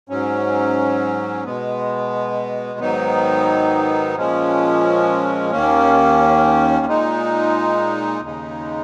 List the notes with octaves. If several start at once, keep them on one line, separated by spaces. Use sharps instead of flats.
G#2 F#3 C#4
B2 G#3 B3
G#2 D#3 F#3 B3 D#4
A#2 F3 G#3 C#4
D#2 D#3 A#3 C#4
A#2 G#3 D#4
D#2 C#3 G#3 D#4